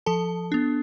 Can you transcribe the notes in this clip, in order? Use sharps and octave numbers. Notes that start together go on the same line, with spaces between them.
F3 A4 A5
B3 D4